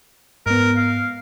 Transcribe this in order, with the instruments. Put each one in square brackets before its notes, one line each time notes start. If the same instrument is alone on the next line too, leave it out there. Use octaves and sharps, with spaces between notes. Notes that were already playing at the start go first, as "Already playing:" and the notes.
[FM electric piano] G#2 B3 [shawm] A#4
[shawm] F5